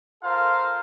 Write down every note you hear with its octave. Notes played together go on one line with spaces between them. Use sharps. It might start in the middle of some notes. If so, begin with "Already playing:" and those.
F4 A4 A#4 C5 F5